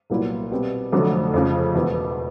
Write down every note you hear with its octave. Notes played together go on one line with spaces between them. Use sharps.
C2 A#2 F#3 B3 E4
B2 G3 C4
F1 F2 D3 F#3 A3
F2 C#3 F3
E1 E2 B2